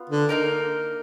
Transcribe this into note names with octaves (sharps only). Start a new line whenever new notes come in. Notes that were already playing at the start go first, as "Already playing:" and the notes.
Already playing: B3 F4
D3
A#3 D#4 A#4